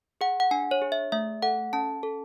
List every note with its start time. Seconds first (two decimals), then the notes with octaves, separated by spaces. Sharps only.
0.21 G#4 F#5
0.40 F#5
0.51 D4 G#5
0.71 C#5
0.82 G#4
0.92 E5
1.12 A3 E5
1.42 A4 F#5
1.73 C#4 A5
2.03 A4